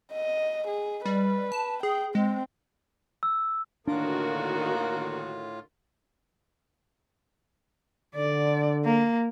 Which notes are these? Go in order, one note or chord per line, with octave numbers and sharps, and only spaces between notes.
D#5
G#4
G3 B4
A5
G#4 G5
G#3 C4
E6
A2 D3 D#3 A#3 D4 F4 F#4
D3 D5
A#3